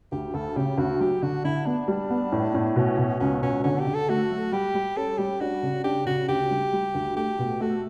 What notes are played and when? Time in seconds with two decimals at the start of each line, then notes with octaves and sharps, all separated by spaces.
0.12 D2 G4
0.34 D2 A4
0.56 C#3 G4
0.78 D2 F#4
1.00 F#3 G4
1.22 D3 F#4
1.44 D3 E4
1.66 B3 D4
1.88 G3
2.10 B3
2.32 A2
2.54 A2
2.76 B2 C#4
2.98 B2
3.20 C#2 C#4
3.42 B2 C#4
3.64 D3 C#4
3.79 G4
3.87 D3
3.94 A4
4.09 A3 F#4
4.31 F#3
4.52 G3 G4
4.74 G3
4.96 C#4 A4
5.18 G3 G4
5.40 D4 F#4
5.62 C#3
5.84 D4 G4
6.06 C#3 F#4
6.28 D2 G4
6.50 G3
6.73 G3
6.95 D2
7.16 A3 G4
7.39 B2
7.61 A3 F#4